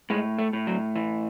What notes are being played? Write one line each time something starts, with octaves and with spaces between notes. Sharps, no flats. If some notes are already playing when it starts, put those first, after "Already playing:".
A2 G#3
A3
A2
F#3
E3